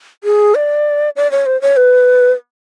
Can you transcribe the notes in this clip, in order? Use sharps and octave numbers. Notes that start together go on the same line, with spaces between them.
G#4
D5
D5
C#5
C5
C#5
B4